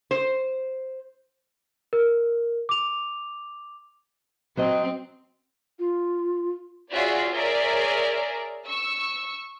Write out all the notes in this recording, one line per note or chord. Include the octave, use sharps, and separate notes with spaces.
C5
A#4
D6 F7
F#3 C4 C5 D#5
F4
F4 F#4 G#4 C#5 D5 E5
G#4 A#4 C#5 D5 E5
C#6 E6